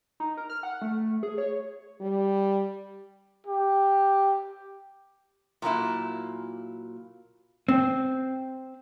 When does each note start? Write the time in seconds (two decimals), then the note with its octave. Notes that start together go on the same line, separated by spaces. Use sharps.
0.20 D#4
0.37 A#4
0.50 F6
0.63 F#5
0.82 A3
1.23 G#4
1.38 C#5
2.01 G3
3.47 G4
5.62 A#2 F#3 A#3 E4
7.69 C4